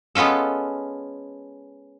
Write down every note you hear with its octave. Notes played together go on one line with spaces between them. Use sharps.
G#3 B3 C#4 F4 A4